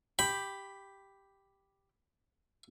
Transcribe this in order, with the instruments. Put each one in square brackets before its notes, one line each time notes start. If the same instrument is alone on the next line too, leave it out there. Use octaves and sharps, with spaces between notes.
[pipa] G4 [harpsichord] B5